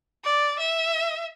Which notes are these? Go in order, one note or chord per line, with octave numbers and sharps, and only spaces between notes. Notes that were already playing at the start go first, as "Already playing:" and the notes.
D5
E5